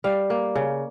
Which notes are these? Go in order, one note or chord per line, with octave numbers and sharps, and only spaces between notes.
G3 F5
A#3
C#3